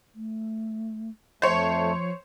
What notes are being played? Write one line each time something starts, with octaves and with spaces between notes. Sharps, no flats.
A3
F2 F3 A3 C5 C#5